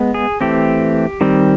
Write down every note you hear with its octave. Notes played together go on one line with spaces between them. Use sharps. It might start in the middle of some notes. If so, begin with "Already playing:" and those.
Already playing: G#3 B3
G#4
E3 A3 C4 G4
D#3 G3 C4